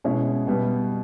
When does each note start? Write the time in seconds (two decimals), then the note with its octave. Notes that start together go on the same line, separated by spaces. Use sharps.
0.04 B2 G#3 C#4 E4
0.47 B2 G3 B3